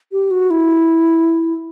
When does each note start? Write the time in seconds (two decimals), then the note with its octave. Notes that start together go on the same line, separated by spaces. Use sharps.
0.12 G4
0.31 F#4
0.50 E4